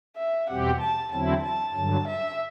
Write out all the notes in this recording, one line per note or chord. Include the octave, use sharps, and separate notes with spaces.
E5
E2 B2 G3 C4 G4 F#5
A5
E2 D3 F#3 C4 E4 A5
A5
G2 D3 F#3
E5